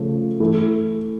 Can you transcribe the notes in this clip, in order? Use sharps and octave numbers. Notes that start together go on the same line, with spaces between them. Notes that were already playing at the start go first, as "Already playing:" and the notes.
Already playing: C#3 F3 A3
E3 A3 E4